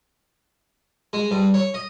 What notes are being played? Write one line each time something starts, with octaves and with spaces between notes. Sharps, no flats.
G#3
G2
C#5
D#5